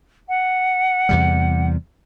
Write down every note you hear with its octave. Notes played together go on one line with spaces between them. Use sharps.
F#5
E2 C3 G3